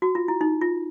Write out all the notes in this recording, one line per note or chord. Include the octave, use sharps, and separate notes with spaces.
F#4
F4
E4
D#4
F4